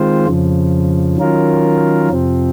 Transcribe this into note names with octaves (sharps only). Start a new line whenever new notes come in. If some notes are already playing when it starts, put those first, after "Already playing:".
Already playing: D#3 G#3 C4 F4 C5
F2 C#3 F3
D#3 F#3 C#4 F4 A#4
F2 C3 F3 C4